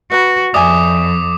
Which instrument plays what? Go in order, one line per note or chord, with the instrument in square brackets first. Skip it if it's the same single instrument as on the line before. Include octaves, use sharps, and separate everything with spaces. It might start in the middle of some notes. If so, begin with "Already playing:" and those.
[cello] F#4 [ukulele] B4 B5
[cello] F2 [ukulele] D5 E5 G#5 [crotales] D6 D#6